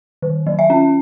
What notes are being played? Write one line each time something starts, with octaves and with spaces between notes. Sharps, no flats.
D#3
F#3
E5
C#4